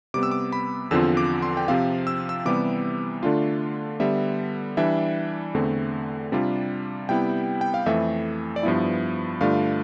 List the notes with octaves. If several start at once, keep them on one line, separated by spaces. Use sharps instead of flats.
C3 G3 B3 D6
E6
D6
B5
E2 D3 F3 C4 F4 E6
D6
C6
G5
C3 F3 C4 F4 F5
E6
E6
C3 E3 G3 B3 D6
D3 A3 D4 F4
D3 G3 B3 E5
E3 G3 D4 E5
E2 D3 A3 C4
C3 G3 D4 F4
C3 G3 B3 E4 G5
G5
F5
F2 E3 A3 E5
D5
G2 F3 B3 E4 E5
G2 D3 A3 D4 F4 F5